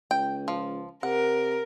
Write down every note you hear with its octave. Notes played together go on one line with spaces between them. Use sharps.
C#2 G5
F3
C3 A#4 F#5